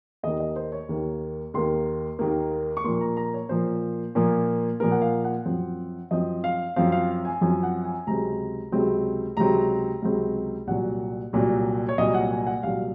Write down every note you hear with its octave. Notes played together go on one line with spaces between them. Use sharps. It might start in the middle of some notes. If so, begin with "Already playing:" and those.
D#2 D#3 A#3 D#5
D#5
C5
C#5
D#2 D#3 A#3
D#2 D#3 A#3 C6
D#2 D#3 A#3
C#6
A#2 F3 A#3 C6
A#5
A#5
C#5
A#2 F3 A#3 C5
A#2 F3 A#3
A#2 F3 A#3 A#4
F#5
F5
F#5
F#2 F3 C4
F#2 F3 C4 D#5
F5
F#2 F3 C4 F5
F5
G#5
F#2 F3 C4 G#5
F#5
G#5
C#2 C3 F#3 C4 A#5
C#2 C3 F#3 C4
C#2 C3 F#3 C4 A#5
C#2 C3 F#3 C4
C2 A#2 F#3 F#5
C2 A#2 F#3
C#5
C2 A#2 F#3 D#5
F#5
G#5
F#5
C2 A#2 F#3 F5